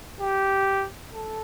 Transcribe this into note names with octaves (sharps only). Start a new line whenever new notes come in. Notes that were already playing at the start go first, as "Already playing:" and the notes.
G4
A4